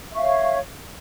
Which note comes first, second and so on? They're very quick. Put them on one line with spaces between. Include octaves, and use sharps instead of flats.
E5 C#6 F5 C#5